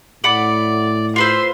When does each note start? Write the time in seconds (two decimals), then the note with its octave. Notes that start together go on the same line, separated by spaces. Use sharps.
0.24 A2 D5 F#5 B5 D6
1.16 F4 B4 C5 C6 E6